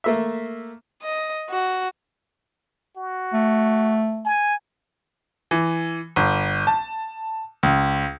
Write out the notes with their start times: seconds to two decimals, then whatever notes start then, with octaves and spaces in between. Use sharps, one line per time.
0.04 A3 A#3 E5
1.02 D#5
1.50 F#4
2.97 F#4
3.33 A3
4.25 G#5
5.51 E3
6.16 G1
6.67 A5
7.63 C#2